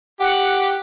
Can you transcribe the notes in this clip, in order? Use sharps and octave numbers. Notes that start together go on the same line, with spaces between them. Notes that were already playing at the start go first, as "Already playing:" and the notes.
G4 F#5